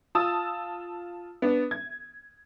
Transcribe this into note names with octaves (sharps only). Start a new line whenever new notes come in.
F4 A5 D#6 E6
B3 D4
G#6